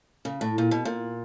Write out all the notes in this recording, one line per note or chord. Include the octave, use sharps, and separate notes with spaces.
C#3
A2
A#2
B2
A#2